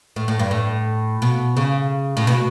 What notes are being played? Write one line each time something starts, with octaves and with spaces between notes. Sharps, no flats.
A2
A2
G2
A2
B2
C#3
A2
B2